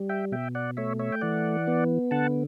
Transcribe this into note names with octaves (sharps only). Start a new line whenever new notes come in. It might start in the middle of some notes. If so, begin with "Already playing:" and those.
Already playing: G3
E5 G5
B2 E5 G5
D5 F#5
A3 C#5 E5
C#5 E5
G5
E3 D5 F#5
B3
D3 F#5 A5